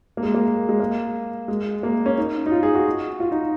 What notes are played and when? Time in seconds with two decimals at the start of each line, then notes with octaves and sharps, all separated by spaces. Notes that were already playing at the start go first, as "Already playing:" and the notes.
0.17 A#3
0.23 G#3
0.34 A#3
0.69 G#3
0.80 A#3
1.48 G#3
1.83 A#3
2.06 C#4
2.18 D#4
2.46 D#4
2.52 F4
2.63 G#4
2.75 F#4
3.20 F4
3.32 D#4